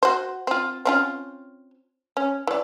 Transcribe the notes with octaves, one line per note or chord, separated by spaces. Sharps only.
F#4 C5
C4 F4
C4 C#4 F4
C#4
E3 D5